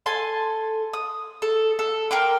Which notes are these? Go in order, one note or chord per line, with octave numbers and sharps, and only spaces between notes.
A4 G#5 A5 C6
D#6
A4
A4
A#4 G5 C6 D6